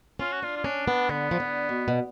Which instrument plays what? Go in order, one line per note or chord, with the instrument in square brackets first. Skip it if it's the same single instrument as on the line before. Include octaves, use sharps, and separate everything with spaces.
[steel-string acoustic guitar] C#4 [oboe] F4
[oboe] F#4
[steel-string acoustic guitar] D4 [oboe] F4
[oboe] F4
[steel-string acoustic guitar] C#4 [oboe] D4
[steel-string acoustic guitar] B3
[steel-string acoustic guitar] D3 [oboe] B3
[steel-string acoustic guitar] F3
D3
B2
B2